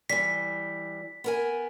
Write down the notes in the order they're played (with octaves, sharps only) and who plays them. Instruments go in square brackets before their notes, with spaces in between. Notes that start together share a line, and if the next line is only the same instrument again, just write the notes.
[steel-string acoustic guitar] E3 G3 [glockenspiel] B6
[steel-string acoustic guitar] B3 A#4 G#5